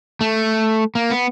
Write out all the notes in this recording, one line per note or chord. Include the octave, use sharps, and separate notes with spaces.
A3
A#3
B3